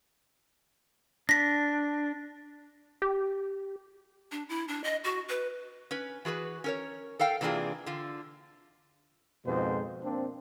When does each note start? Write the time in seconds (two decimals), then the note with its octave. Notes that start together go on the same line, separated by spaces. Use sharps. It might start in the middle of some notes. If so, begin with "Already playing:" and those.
1.29 D4 A#6 B6
3.02 G4
4.31 D4
4.49 E4
4.68 D4
4.84 D#5
5.04 F#4
5.29 B4
5.91 C#4 B4
6.25 E3 F#4 G#4 B4
6.64 C#4 A#4 C#5
7.19 A4 A#4 F5 G5
7.41 C3 E3 A#3 D4 F4 G#4
7.86 D3 F4
9.45 F2 G#2 B2 F3 G#3 C5
10.03 A#3 C4 D4